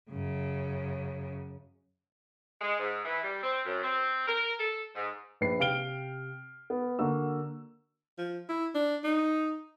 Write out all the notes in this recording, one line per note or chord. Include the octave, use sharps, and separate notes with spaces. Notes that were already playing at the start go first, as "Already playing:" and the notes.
F#2 C#3
G#3
G#2
E3
G3
C4
F#2
C4
A#4
A4
G#2
A#1 B4 C7
C3 F5 G5 F6 D7 G7
B3
D3 A#3 F#4 E6
F3
E4
D4
D#4